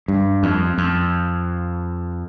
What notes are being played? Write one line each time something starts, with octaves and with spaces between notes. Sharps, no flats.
G2
F2
F2